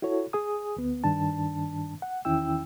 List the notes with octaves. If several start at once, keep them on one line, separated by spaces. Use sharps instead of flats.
E4 F#4 A4 C#5
G#4 G#5 D#6
D2 B3
G2 D#3 D4 A5
F#5
E2 D#3 C#4 E4 G5 E6